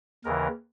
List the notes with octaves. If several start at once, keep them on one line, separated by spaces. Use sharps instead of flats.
D#2 C#3 E3 A#4